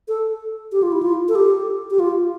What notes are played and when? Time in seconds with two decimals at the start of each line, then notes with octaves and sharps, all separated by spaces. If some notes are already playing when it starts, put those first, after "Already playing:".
0.08 A4
0.72 G4
0.83 F4
0.92 E4
1.03 F4
1.29 A4
1.35 G4
1.90 G4
1.99 F4